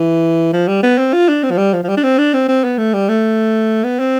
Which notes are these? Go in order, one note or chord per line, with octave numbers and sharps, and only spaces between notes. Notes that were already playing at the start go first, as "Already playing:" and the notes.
Already playing: E3
F3
G3
B3
C4
F4
D4
C4
F3
G3
F3
F3
G3
D4
C4
D4
C4
C4
B3
A3
G3
A3
B3
C4